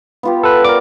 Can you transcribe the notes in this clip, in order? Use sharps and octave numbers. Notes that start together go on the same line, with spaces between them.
B3 F4 G4
A4 B4
A#4 D5 D6